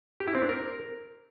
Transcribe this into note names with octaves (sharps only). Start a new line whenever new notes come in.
G4
E4
C4
D4
A#4